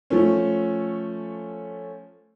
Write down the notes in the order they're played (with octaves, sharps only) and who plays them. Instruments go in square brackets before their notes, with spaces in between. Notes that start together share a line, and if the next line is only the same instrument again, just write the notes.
[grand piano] F3 A3 C#4